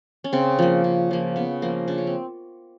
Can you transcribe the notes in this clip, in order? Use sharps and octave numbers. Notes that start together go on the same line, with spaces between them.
C#4
C#3 C4
F3 A#3
C#3
F3 A#3
C#3 B3
F3 A#3
C#3 D4
C#4
C4